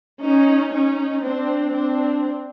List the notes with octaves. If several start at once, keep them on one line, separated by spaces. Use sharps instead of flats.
C#4 D#4
C#4 D#4
C4 D4
C4 D4